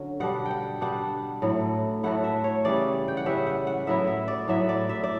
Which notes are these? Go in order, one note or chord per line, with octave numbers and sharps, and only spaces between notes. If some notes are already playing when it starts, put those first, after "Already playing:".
Already playing: D3 F#3 C#4
B2 G3 D4 F#5
F#5 G5
B2 G3 D4 F#5
A2 F#3 A3 E4
A2 F#3 A3 E4 F#5
E5
C#5
C#3 E3 G3 C#4 D5
G5
F#5
C#3 E3 G3 C#4 E5
F#5
F#5
A2 F#3 B3 E4 E5
E5
D5
A2 F#3 B3 E4 E5
D5
E5
D5